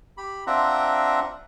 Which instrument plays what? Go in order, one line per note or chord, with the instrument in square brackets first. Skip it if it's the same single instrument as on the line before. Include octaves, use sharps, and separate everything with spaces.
[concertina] G4 B5
C4 D4 F4 E5 F#5 A#5